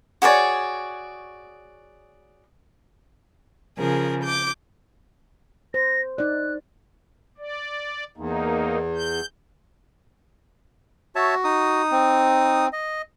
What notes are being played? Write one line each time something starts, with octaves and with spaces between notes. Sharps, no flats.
F#4 G#4 C#5 D5
C#3 F3 G#4 A#4
D6 G6
C5 A#6
D#4 D5 F#6
D5
E2 A#3 D#4
G6
F#4 C#5 E5 A5
D#4 D#6
C4
D#5